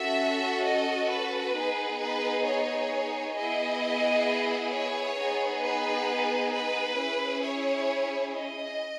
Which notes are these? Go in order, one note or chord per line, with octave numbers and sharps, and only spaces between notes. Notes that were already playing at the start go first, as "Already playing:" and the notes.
Already playing: C#4 F#4 A4 E5
D#5
B4
B3 D#4 G#4
B4
C#5
B3 E4 G#4 D#5
C#5
B3 D#4 G#4
B4
B4
C#4 E4 G#4
C#5
D#5